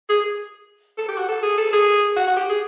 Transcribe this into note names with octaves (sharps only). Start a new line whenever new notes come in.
G#4
A4
G4
F#4
A4
G#4
A4
G#4
F#4
F#4
G4
G#4